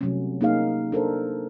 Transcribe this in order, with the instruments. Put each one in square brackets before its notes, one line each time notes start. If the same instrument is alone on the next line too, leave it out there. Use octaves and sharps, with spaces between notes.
[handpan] C3 F#3 G3 A3 C#4
A#3 D#4 G#4 F5
D4 A4 A#4 C5